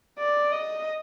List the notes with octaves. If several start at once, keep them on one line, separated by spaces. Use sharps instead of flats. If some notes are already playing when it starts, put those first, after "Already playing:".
D5
D#5